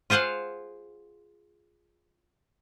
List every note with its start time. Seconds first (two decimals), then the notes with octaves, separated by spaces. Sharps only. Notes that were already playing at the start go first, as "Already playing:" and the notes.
0.10 F4 G#4 C5 F5 F#5